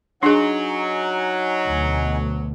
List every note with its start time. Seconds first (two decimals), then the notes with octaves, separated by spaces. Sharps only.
0.23 F#3 D4 D#4 G#4 F#5 G#5
1.68 D2 B2